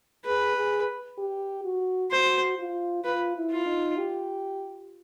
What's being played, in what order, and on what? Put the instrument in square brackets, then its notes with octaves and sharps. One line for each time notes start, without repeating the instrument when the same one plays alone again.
[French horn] G#4 [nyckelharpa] B4
[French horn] G#4
G4
F#4
[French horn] F#4 [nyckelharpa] C5
[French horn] F4
[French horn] F4 [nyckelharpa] B4
[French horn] E4
[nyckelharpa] F4
[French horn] D#4
G4